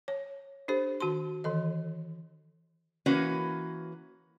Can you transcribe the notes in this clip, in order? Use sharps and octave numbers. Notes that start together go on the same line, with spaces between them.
C#5
D4 G4 A4 C5
D#3 F#4 A5 C6
D#3 E3 A4 D#5
E3 A#3 C#4 F#4 A#4 B4